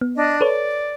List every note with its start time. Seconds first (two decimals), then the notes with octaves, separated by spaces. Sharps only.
0.01 B3
0.16 D4 D#5
0.41 A4 B4 C#5 D5